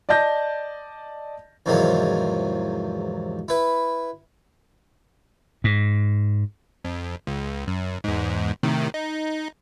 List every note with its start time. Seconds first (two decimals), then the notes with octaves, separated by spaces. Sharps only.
0.09 D5 D#5 A5 G6 A#6
1.66 E2 G#2 C3 D#3 F3 F#3
3.48 E4 B4
5.64 G#2
6.85 F2
7.27 C#2
7.67 F#2
8.04 E2 G#2
8.63 A2 C3 D#3
8.94 D#4